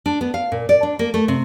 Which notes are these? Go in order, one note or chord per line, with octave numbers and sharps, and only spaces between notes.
D4
B3
F5
A#2
D5
D4
A#3
A3
C3